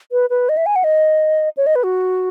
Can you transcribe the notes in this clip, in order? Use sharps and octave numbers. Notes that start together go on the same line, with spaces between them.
B4
B4
D#5
E5
G#5
F#5
D#5
C#5
D#5
B4
F#4